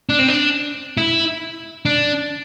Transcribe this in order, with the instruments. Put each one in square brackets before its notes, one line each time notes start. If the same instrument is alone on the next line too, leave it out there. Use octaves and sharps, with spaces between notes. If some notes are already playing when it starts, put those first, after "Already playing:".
[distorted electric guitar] D4
C4
D4
E4
D4